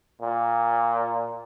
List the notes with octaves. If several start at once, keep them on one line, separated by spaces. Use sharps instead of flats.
A#2